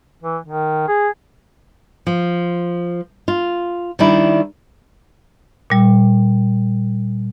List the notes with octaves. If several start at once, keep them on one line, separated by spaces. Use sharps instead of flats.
E3
D#3
G#4
F3
F4
D#3 G3 D4 E4
A#2 G3